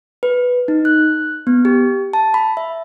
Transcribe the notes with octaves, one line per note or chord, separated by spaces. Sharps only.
B4
D#4
F#6
B3
G4
A5
B5
E5